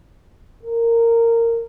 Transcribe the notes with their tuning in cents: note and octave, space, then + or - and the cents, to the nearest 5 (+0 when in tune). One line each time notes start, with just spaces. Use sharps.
A#4 -15